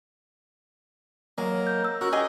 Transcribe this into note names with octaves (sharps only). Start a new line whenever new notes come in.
F#3 G#3 A#3
G6
E6
C#4 F#4 A#4
G4 G#4 D#5 G#5